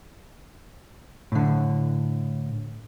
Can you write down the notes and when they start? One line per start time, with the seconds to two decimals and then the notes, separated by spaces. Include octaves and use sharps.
1.32 A2 D3